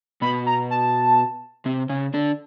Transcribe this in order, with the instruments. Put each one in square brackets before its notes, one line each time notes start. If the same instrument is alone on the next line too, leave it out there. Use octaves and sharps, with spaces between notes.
[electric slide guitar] B2 B3 [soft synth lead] B5
[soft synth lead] A#5
A5
[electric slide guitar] C3 C4
C#3 C#4
D3 D4